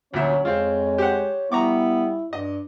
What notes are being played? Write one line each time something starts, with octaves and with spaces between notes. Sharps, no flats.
D2 A#2 F#3 C#4 C#5 E5
F2 G#3 C4 F4
G4 C5 F#5
G3 B3 E4 A#5 C#6 D6
G2 D5 D#5